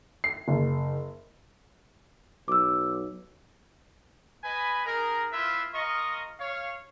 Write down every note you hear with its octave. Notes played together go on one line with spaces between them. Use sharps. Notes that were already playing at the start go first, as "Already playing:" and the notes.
C7
F#1
B1 D6 E6
B4 D#5 G#5 B5
D#4 G#4 A#4
E4 F4 B4 E5
F4 A#4 D#5 C#6
C#5 F5